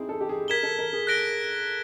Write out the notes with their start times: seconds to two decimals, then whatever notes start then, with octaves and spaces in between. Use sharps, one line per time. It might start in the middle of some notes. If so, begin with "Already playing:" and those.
Already playing: C4 D#4 E4 G#4
0.09 A4
0.20 G4
0.29 G#4
0.48 A#4 G#6 B6 E7 G7
0.63 A4
0.79 A#4
0.93 G#4
1.07 F#6 A#6 D7 G7